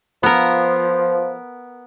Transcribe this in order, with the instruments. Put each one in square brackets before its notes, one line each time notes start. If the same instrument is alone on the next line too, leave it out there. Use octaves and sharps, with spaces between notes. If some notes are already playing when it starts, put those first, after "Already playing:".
[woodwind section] F3 [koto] B3 A#4